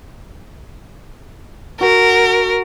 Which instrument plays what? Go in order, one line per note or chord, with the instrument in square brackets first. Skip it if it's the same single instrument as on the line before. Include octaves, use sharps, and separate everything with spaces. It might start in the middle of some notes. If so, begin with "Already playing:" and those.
[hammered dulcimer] F#4 [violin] A#4